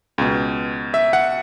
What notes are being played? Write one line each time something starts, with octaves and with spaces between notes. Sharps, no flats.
C#2 B2
E5
F#5